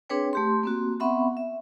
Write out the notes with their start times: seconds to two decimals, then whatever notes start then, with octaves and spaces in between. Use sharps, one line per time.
0.10 C4 D4 G#4 B4 C#5 G5
0.33 A3 G4 C6
0.63 A#3 C4 F#4
1.00 B3 C4 E5 F#5 B5 C#6
1.37 E5